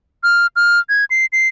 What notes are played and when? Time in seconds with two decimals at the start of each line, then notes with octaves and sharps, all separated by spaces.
0.24 F6
0.56 F6
0.89 G#6
1.10 C7
1.33 C7